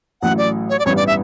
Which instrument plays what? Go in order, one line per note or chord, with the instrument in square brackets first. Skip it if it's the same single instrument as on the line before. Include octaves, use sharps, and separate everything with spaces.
[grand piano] A1 A2 F#3 [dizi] F#5
[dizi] D5
C#5
D5
[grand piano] A1 G2 E3 G3 B3 [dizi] C#5
[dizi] D5
E5